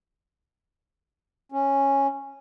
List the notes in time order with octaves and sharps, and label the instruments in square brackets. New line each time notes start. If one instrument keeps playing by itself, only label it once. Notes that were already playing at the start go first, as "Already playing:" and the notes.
[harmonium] C#4